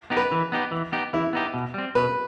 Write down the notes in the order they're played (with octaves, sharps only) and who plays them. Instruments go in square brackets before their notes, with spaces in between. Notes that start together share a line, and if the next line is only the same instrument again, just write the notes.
[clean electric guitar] B3 D#4 G4
[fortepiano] B4
[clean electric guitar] E3
B3 D#4 G4
E3
B3 D#4 G4
[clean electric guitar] E3 [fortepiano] E4
[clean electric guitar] B3 D#4 G4
B2
G3 C4
[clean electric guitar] B2 [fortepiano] B4